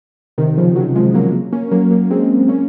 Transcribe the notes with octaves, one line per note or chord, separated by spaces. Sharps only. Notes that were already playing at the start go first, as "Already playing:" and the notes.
C3 D#3
C#3 F3
D#3 F#3
F3 G#3
F#3 A#3
A#3 C#4
F#3 A#3
F#3 A#3
G#3 C4
A#3 C#4